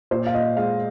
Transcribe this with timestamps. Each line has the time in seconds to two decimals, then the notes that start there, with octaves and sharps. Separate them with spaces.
0.11 A#2 C5
0.26 F5
0.34 A#2 D#5
0.57 G#3 F5